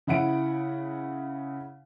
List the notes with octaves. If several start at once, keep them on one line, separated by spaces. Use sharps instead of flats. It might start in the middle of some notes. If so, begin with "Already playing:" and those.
C#3 E4 F#5 D7